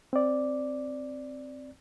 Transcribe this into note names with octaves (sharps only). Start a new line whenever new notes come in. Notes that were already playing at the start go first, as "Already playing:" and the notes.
C4 D5